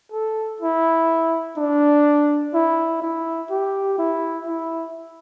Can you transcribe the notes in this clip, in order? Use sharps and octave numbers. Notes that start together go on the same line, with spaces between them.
A4
E4
D4
E4
E4
G4
E4
E4